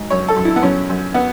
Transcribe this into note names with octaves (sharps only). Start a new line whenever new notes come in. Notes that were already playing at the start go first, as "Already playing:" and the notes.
Already playing: G#2 F#3
F#2 C#5
A4
F#2
E4
B3
F#2 C#4
F#2
B3